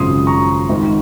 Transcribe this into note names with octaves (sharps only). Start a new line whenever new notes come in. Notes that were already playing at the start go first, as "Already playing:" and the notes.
Already playing: G#1 F#2 C#3 F3 C6 D#6
A#5 C#6
G#1 G#2 D#3